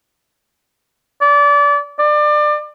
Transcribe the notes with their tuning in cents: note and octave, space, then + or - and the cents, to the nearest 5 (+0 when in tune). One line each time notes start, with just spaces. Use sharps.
D5 -25
D5 +30